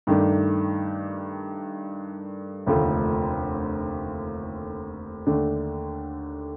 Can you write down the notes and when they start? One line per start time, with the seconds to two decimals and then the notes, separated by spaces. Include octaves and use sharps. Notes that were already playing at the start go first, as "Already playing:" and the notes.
0.07 G2 D#3 A3 D4
2.66 F1 D#2 D3 F3 A3
5.27 D#2 D3 A3 D4